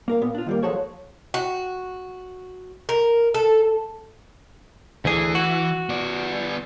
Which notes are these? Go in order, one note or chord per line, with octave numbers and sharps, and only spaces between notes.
A#3 A#4 F5
A#2 B3
D4 F4
D#3 G3 A#3
F3 F#3 G#3 A4 C5 C#5
F#4
A#4
A4
D2 E3 G#4
F#4
B3 D5